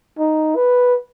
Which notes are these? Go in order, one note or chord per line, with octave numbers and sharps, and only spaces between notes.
D#4
B4